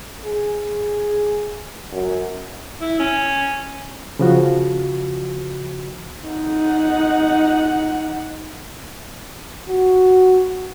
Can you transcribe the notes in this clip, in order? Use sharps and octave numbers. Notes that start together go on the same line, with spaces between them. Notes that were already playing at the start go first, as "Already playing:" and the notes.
G#4
F#2
E4
C#4
C#3 F3 F#4
D#4 F#5
F#4